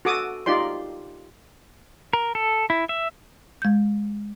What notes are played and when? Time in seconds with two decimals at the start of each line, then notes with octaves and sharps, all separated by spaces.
0.05 F#4 A4 D6 D#6
0.46 D#4 F4 G4 D5 C6
2.13 A#4
2.35 A4
2.70 E4
2.89 E5
3.62 G#3 G6